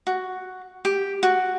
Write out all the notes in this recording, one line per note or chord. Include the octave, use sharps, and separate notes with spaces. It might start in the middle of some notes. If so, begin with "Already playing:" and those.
F#4
G4
F#4